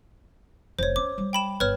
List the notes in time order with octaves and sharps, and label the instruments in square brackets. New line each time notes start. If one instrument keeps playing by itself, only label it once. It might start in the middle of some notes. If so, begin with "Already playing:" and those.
[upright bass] F1 C#3 [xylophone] C5 C#5
[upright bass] C#4 [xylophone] D6
[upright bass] G3
[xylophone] G5 B5 E7
[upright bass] G1 [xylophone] B4 C#5 F6